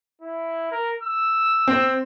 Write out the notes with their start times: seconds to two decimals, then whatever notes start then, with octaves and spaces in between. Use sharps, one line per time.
0.21 E4
0.72 A#4
1.03 E6
1.68 C4